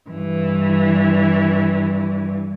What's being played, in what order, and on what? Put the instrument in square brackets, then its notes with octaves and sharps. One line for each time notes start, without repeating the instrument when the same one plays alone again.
[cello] G2 E3